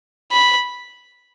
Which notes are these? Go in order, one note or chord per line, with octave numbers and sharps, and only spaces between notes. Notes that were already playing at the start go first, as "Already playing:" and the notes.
B5